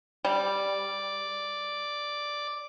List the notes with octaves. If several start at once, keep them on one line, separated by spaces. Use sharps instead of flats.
G3 D5